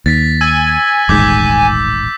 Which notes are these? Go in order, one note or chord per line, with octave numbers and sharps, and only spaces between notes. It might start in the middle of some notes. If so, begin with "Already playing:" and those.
D#2 A6 B6
G#5 E6
D#1 A1 G#2 D6 G6 B6